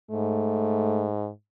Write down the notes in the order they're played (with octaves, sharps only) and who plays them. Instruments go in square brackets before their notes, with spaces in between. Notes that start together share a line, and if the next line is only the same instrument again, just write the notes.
[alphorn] G#2 [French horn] A3